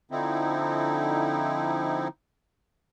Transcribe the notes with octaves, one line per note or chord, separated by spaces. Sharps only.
D3 F3 C4 D#4 E4